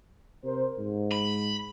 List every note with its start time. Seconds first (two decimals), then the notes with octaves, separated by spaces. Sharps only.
0.44 C3 A#4 C5
0.79 G#2
1.12 B5